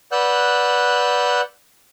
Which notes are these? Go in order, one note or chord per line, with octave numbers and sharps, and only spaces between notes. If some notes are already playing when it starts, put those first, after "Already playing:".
B4 D5 F#5 E6 F#6 G6